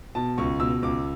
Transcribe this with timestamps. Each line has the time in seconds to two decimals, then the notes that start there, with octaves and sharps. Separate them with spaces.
0.15 B2 A5
0.38 C#2 C#6
0.60 B2 E6
0.82 C#2 D6